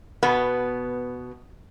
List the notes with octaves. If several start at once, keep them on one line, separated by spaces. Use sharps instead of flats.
B2 B3